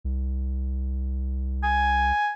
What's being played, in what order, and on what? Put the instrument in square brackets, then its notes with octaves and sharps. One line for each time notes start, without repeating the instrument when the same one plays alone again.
[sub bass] C2
[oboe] G#5